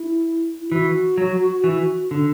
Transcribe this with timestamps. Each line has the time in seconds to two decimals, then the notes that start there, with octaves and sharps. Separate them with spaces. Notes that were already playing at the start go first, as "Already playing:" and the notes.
Already playing: E4
0.61 E4
0.71 E3 F#4
1.18 F#3
1.64 E3
2.11 D3